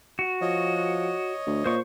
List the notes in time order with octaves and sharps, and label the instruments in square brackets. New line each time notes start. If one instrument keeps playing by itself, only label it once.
[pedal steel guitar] F#4
[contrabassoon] F3 [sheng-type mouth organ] C#5 D#5
[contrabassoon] D2
[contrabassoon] A#2 [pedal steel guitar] C5 C#6